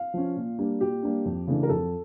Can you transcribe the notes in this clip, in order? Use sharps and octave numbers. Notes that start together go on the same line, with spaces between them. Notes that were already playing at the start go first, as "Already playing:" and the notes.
Already playing: F5
F3 C#4
A#2
G3 A#3 D4
A#2 G4
G3 A#3 D4
F2
C#3 E3 A3 D4
A#4
F2 A4